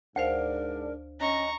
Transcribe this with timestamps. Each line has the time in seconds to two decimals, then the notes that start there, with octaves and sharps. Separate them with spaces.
0.16 D2 G#2 D4 A#4 C5 F5
1.20 C#4 D#5 A#5 C#6